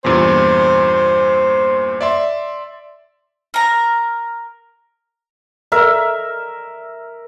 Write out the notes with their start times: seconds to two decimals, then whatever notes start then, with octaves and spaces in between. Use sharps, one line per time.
0.04 E2 G2 A#2 C5
2.01 D5 E5 C6
3.54 A#4 A#5
5.72 A#4 E5